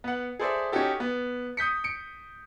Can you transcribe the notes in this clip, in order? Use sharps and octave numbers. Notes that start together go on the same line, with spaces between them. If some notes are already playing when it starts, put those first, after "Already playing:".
B3 F#5
G#4 A4 C5 D5 E5
C#4 D#4 F#4 G4 A4
B3
D#6 G6 B6 C#7
C#7 D7